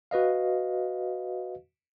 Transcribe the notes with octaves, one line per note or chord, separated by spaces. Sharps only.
F#4 B4 D#5 F5